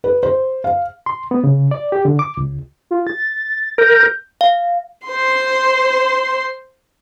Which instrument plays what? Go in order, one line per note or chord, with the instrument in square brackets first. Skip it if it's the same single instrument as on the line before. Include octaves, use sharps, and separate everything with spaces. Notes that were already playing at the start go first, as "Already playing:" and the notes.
[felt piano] B4
C5
F5
[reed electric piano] C6
B3
C#3
D5
G4
D3
D6
C#2
[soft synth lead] F4
A6
[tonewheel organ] A#4 [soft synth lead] G6
[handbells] F5
[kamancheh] C5 C6